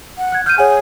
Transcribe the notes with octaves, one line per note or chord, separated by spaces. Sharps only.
F#5
F#6 G#6
F6 G6 D#7
G#4 C#5 F#5 G#5